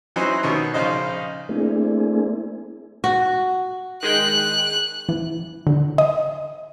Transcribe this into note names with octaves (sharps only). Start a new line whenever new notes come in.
E3 F#3 C#4 D#4 E4 C5
B2 D#3 B3 C#4
A#1 C#3 D#4 C5 D#5
A3 A#3 C4 D4 E4 G#4
F#4
D#3 G#3 G5 F#6
E3
D3
D#5